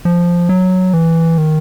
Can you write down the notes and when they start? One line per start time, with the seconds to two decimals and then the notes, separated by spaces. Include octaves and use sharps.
0.05 F3
0.49 F#3
0.93 E3
1.38 D#3